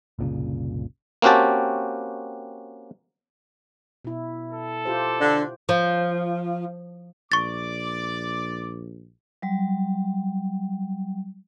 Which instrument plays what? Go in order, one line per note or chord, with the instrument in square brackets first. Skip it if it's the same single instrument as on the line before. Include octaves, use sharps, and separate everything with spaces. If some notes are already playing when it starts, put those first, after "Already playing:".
[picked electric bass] F#1 C2 A#2 C#3
[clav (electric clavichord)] A#3 C4 C#4 F#4 G4 A5
[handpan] B2 E4
[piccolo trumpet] A4
[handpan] F4 G4 C5
[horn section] D3 D4
[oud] F3
[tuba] A#1 [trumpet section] D5 D6 [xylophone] C#6 A6
[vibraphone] F#3 G3